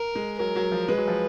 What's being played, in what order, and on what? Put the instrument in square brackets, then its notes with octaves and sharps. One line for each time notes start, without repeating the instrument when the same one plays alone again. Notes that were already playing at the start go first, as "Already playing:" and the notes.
Already playing: [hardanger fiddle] A#4
[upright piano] G#3
[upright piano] F#3 [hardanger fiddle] A#4
[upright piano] F#3
F3
[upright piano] G#3 [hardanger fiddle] B4
[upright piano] F#3
F3